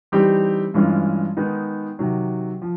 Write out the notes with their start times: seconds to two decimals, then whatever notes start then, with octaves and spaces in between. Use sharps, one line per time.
0.12 E3 G3 C4 D#4 G4
0.74 G2 E3 G#3 C#4 F4
1.37 D#3 G#3 B3 D#4
1.99 C3 D#3 F#3
2.62 F3